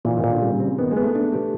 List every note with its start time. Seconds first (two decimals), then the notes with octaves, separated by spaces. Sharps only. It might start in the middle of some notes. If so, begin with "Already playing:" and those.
0.05 A#2 E3
0.17 D#3
0.24 A#2
0.30 D3
0.42 C#3 G3
0.60 C4
0.79 D#3 B3
0.91 G#3
0.97 B3
1.02 A3
1.15 D4
1.33 G4